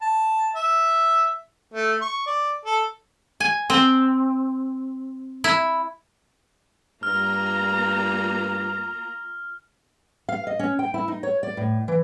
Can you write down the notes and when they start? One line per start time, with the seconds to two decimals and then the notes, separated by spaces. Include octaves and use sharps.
0.02 A5
0.55 E5
1.74 A3
2.01 C#6
2.26 D5
2.65 A4
3.40 G#5
3.70 C4
5.44 E4
7.03 G2 A#3 F4 A#5 F6
10.29 F5
10.47 D#5
10.59 C#4
10.79 G5
10.94 E4
11.08 D#4
11.23 C#5
11.43 D5
11.57 A2
11.88 E3